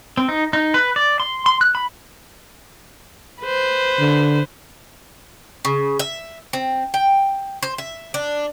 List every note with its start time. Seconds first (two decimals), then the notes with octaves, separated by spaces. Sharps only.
0.17 C4
0.29 D#4
0.53 D#4
0.74 B4
0.96 D5
1.20 C6
1.46 C6
1.61 F#6
1.75 B5
3.42 B4 C5
3.99 D3
5.65 C#3
5.99 E5
6.53 C4
6.94 G5
7.63 C5
7.78 E5
8.14 D4